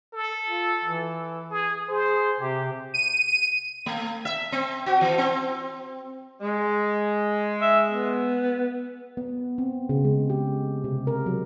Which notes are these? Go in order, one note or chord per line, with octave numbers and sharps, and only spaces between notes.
A4
F4
E3
G#4
G#4 C5
C3 G4
D#7
A3
E5
C4
F#4
E3
C4
G#3
E5
B3
B3
C4
C#3
G#3
G4
C3
A#4
F#3